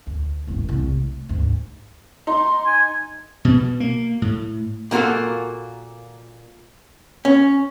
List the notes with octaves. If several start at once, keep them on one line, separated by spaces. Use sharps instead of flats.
D2
E1 A1
C2
A3
D2 G#2
D#4 C6
G#5
B2
A#3
A2
A#2 A#3 F4 F#4 A4
C#4